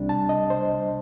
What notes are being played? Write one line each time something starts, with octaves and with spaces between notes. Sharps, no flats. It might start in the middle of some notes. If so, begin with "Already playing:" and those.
Already playing: C2 C3 G3 D4
A5
D#5
C5